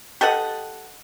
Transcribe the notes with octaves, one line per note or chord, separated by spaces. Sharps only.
G4 A4 D#5 F#5